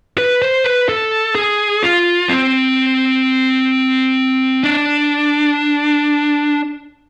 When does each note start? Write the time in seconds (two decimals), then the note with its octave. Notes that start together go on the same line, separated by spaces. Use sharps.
0.18 B4
0.42 C5
0.64 B4
0.89 A4
1.35 G#4
1.83 F4
2.29 C4
4.64 D4